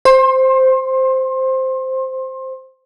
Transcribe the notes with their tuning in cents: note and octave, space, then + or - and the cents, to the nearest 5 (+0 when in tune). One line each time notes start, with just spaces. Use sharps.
C5 +0 C6 +30